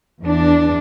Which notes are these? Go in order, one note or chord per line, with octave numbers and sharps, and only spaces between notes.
E2 D4